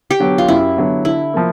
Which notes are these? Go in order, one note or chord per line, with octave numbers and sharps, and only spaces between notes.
G4
D3 F#3 B3
F4
F#2 E4
D3 F#3 B3
D3 E4
F3 A#3